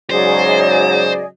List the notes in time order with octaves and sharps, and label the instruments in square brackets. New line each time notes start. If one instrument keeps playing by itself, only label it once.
[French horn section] G#2 C#3 F#3 [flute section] G#4 D5 D#5 [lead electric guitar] C5